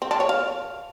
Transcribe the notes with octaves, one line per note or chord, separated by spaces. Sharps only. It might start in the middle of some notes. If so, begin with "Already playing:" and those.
C4
D4
C#5
F5